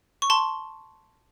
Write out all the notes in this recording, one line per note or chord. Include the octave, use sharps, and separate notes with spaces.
C#6
A5 C6